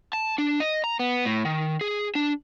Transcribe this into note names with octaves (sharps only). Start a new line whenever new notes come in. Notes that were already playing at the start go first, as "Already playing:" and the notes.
A5
D4
D#5
A#5
B3
A2
D#3
G#4
D4